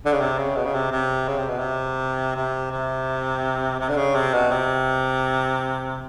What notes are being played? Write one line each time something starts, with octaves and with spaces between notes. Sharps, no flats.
D3
C#3
C3
C#3
B2
C#3
C3
C3
C#3
C3
B2
C3
C3
C3
C3
D3
C#3
C3
B2
C3